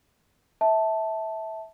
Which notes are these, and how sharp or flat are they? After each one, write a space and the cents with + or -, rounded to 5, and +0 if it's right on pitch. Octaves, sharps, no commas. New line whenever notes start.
E5 -20 A5 +0